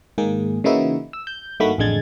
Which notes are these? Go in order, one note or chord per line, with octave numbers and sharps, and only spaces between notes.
G#2 D#3 A#3 G#4
C#3 E3 A#3 D#4 E4 F#4
E6
G6
G2 D#3 A3 A#3 F#4 B5
A1 F2 D3 G#3 G#6 A6